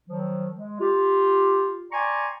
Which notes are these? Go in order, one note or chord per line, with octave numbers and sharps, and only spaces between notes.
D#3 F3 F#3
G#3
F4 G4
D5 G5 G#5 A#5 C6 C#6